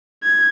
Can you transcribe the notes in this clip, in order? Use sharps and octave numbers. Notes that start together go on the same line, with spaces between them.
G#6